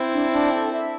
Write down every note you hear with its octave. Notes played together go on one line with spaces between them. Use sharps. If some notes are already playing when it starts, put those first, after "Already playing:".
Already playing: C4 E4
D4
D4
A4
E5